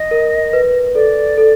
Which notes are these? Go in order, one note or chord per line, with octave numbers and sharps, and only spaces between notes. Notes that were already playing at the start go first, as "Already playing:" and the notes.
Already playing: D#5
A#4
B4
A4 D5
A4